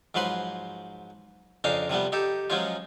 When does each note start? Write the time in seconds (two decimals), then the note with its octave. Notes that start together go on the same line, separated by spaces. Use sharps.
0.14 G#2 F3 F#3 B4 C6
1.64 F2 C#3 D4 D#4 F5
1.89 C3 F3 G3 B3
2.12 D#4 G4 A4
2.50 F3 F#3 G#3 C#4 D#4 F4